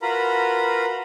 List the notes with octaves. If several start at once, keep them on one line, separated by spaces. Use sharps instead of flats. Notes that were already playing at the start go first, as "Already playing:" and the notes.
F4 F#4 A#4 B4 A#5 B5